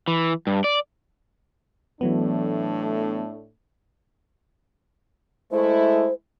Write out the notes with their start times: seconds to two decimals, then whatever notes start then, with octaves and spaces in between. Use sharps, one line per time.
0.08 E3
0.47 G2
0.64 D5
2.01 A2 E3 F#3 A3 B3 D4
5.52 G#3 A3 E4 C5